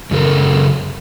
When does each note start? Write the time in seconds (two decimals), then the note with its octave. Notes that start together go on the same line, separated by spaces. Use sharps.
0.11 F#2 C#3 A4 A#4